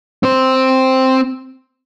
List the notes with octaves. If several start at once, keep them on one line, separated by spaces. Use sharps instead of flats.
C4 C5